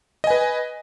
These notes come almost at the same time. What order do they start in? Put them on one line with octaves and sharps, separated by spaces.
D#5 G#5 B4